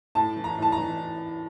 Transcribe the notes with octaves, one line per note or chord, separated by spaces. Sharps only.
A2 A5
E3
A#5
A2 A5
A#5
E3